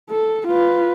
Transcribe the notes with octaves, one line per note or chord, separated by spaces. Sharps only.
A4
F4 B4